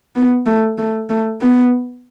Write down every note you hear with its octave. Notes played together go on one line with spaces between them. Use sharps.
B3
A3
A3
A3
B3